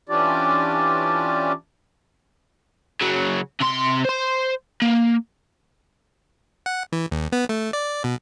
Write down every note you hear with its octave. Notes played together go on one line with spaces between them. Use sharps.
E3 C#4 D4 F4 G4 D5
C#3 F#3
C3 C6
C5 C6
A#3
F#5
E3
D#2
B3
A3
D5
B2